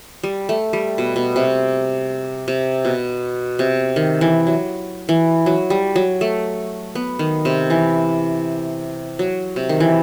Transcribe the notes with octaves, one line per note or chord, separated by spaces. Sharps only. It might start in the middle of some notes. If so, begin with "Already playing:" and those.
G3
A3
G3
B2
B2
C3
C3
B2
C3
D#3
E3
F#3
E3
F#3
G3
F#3
A3
B3
D#3
C3
E3
F#3
C3
D#3
E3